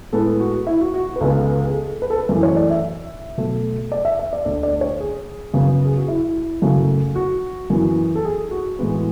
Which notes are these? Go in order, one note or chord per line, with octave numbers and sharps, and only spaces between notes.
A2 G#3 B3 A4
F#4
E4
F#4
F#4
F#4
B4
C#2 C#3 G#3 B3 A4
G#4
A4
B4
A4
B4
F#2 E3 A3
C#5
D5
E5
B2 F#3 A3
D5
E5
E5
D5
D2 D3 A3 D5
D5
C#5
G#4
F#2 C#3 F#3 B3
G#4
F#4
E4
F#2 C#3 F#3 A3
F#4
F#2 E3 B3
A4
G#4
F#4
A2 E3 G#3 B3